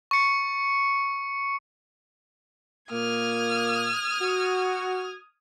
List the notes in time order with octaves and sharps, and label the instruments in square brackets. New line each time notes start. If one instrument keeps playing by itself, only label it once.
[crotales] C#6 C#7
[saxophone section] A#2 A#3 [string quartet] D#6 F6 G#6
[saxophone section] F#4